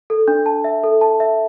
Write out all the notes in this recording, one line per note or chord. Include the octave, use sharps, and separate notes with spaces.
A4
D4
A5
E5
A4
A5
E5